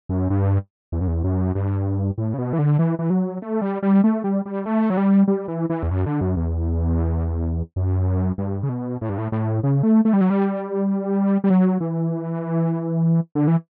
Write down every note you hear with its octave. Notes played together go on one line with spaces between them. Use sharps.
F#2
G2
E2
F#2
E2
F#2
G2
A2
C#3
B2
E3
D3
E3
E3
F#3
A3
G3
G3
A3
G3
G3
A3
F#3
G3
G3
E3
E3
E2
F#2
D3
F#2
E2
F#2
G2
C#3
B2
A2
G2
A2
A2
C#3
A3
A3
G3
F#3
G3
G3
F#3
E3
D3
E3